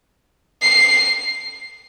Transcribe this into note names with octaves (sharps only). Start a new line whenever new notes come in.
C7